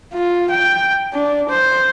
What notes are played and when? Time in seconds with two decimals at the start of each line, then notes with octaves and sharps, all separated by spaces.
0.14 F4
0.51 G5
1.13 D4
1.49 C5